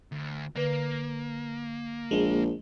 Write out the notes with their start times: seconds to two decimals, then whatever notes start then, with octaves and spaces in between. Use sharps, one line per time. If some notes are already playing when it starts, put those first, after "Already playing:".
0.12 D2
0.56 D3 A#3 B4
2.11 A#1 G#3